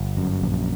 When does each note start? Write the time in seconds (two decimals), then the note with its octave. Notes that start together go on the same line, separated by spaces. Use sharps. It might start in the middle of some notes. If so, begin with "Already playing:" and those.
Already playing: G1
0.17 F#2
0.42 A#1